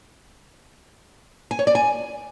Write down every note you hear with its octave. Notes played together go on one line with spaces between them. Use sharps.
G#5
C#5
D5
G#5